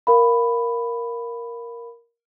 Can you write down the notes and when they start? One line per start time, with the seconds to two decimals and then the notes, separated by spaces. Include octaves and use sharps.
0.07 A#4 F5 B5